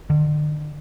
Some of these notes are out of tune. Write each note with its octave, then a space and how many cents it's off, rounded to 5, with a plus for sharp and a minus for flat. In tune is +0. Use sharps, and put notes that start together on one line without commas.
D3 +40